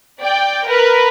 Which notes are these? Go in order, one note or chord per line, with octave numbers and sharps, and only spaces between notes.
D5 G5
A#4 B4